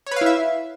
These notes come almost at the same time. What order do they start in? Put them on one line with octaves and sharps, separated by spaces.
C#5 B4 F5 E4 E5